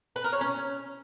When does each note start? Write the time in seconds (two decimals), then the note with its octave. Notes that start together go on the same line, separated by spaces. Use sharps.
0.16 B4
0.24 A#4
0.33 C#5
0.41 C#4